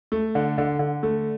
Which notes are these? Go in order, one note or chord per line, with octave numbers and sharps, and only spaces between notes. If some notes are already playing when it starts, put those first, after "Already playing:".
A3
D3
D3
D3
A3